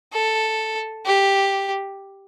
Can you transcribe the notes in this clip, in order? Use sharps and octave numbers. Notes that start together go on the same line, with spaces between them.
A4
G4